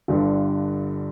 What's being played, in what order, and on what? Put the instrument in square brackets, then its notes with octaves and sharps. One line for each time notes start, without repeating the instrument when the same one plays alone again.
[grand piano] G1 G2 D3